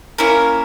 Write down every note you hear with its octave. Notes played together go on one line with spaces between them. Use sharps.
A#3 C#4 E4 A#4